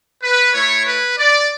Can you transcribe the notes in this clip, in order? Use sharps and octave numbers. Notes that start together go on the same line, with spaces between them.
B4
A3 E4 C#5
B4
D5